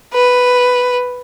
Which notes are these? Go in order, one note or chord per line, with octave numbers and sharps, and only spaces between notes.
B4